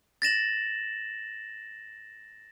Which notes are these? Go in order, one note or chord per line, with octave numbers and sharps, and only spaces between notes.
A6 A#6 E7 F#7